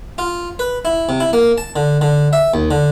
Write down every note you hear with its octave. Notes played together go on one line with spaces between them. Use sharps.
F4
B4
E4
C3
E4
A#3
A5
D3
D3
E5
D#2
D3